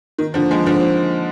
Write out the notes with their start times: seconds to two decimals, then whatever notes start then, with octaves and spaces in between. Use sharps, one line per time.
0.19 D#3
0.34 D3 F3
0.51 F3 G#3
0.66 D3 F3